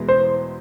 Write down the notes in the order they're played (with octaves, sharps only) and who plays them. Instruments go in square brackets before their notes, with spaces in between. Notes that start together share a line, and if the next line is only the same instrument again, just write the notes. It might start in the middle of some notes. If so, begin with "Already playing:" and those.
Already playing: [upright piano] E2 B2 G#3 B3 E4
[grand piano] C5